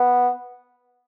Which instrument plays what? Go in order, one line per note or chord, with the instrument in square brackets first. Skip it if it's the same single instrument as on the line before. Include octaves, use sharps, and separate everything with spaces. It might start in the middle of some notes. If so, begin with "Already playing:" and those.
Already playing: [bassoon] B3